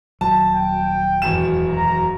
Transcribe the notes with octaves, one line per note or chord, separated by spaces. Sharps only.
D#1 F#3 A5
G5
E1 F#2 E7
A#5